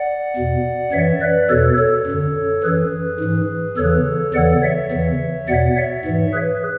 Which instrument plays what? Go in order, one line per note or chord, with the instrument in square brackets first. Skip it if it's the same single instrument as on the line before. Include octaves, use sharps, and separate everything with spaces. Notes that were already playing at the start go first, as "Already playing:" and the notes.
Already playing: [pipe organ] D5 F#5
E2 B2
F#2 E3 C#5 E5
B4 D5
E2 B2 A4 C#5
A4 C#5
F#2 D3
F#2 E3 G#4 B4
G#2 E3
E2 C#3 E3 A4 C#5
E2 C#3 E3 D5 F#5
C#5 E5
E2 C#3 E3
E2 B2 D5 F#5
C#5 E5
G#2 E3
G#4 B4